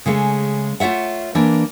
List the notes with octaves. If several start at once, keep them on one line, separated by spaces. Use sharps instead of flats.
C#3 G#3 A3
A3 F4 C#5 E5 F#5
E3 A#3 D4